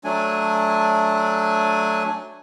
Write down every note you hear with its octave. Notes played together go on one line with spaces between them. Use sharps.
F#3 A3 D4 G#5